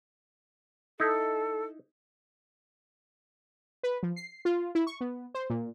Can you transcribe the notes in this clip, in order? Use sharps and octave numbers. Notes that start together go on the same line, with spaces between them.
D#4 E4 A4
B4
F3
C7
F4
E4
C#6
B3
C5
A#2